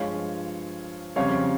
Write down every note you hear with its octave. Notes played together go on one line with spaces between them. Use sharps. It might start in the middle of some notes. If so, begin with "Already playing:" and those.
Already playing: G2 F3 G#3 C#5 F5
F2 C#3 G3 C#5 F5